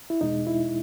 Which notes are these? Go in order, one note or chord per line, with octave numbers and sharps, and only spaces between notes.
E4
E2 B2 G#3 D#4
E4